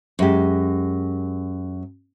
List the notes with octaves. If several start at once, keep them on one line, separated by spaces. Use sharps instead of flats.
F#2 G#3 G4